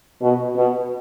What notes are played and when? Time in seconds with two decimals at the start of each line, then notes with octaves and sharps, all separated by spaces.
0.21 B2
0.56 B2